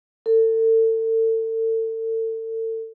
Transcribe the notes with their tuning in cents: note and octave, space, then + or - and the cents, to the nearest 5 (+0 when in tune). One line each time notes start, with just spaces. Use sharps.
A4 +35